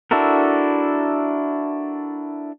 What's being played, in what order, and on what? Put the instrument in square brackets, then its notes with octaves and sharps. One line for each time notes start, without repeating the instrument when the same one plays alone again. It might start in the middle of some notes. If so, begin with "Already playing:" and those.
[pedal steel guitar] D4 E4 F#4 A4 A#4